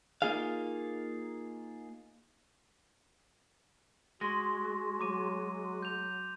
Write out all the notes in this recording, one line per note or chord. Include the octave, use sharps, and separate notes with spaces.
A#3 D#4 F4 G#4 F5
G#3 F#4 C6 A#6
F#3 A#5 D6 D#7
G6 F7